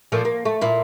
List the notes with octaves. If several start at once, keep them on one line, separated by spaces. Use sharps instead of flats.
A#2 F3 A3
A#3
A3
A#2 E4